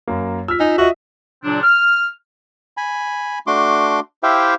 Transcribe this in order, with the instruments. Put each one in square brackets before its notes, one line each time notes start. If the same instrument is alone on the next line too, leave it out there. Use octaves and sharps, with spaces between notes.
[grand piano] F#2 A#3
[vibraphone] F4 [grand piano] E6 F6 B6
[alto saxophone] D#4 [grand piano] G#5
[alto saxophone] F#4 [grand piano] D#5 E5
[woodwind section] A#2 C#3 F#3 C4 D4
F6
[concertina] G#5 B5
A3 D4 F#4 C6 D6
E4 G4 C5 E5 F5 G5